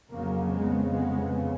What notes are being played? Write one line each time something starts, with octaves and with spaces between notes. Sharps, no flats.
F2 C#3 F#3 A#3
G#3 B3
G#3 B3